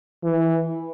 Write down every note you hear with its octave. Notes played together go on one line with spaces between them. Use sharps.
E3